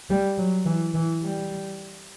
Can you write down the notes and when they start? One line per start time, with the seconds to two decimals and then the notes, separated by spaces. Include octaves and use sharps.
0.10 G3
0.38 F#3
0.65 E3
0.94 E3
1.23 G3